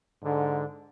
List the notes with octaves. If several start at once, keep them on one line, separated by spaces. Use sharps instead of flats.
G#2 D3